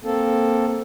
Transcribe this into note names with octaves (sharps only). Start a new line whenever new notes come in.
A#3 C4 A4